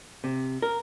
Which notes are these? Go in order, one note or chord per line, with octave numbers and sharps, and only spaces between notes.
C3
A#4